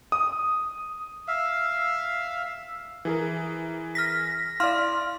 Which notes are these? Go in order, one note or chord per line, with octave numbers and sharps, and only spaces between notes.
D#6
E5 F5
E3 G#4 A#4
F6 A#6 B6
E4 D5 F5 C6 F6